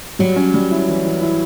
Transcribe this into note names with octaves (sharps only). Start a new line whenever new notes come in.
F#3 G3
C#4
G3
E4
E3
E3
E4